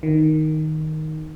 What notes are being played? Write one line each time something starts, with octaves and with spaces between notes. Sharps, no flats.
D#3